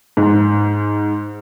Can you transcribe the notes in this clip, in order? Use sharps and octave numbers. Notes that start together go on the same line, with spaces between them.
G#2